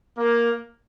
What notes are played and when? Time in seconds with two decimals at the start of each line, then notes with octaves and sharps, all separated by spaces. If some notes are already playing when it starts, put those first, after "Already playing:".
0.18 A#3